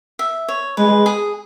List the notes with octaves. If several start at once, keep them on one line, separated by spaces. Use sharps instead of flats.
E5
C#5
G#3 B4
G#4